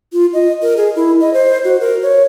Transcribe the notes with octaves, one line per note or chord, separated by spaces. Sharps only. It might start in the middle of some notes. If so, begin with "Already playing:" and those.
F4
D#5
A#4
G#4
E4
D#5
C5
F#4
A#4
C#5